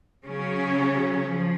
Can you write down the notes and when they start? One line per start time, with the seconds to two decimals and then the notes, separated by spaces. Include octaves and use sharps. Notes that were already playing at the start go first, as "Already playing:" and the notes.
0.25 C#3 F#3 C#4
1.27 F3